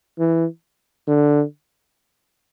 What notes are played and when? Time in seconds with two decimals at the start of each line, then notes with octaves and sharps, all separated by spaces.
0.19 E3
1.08 D3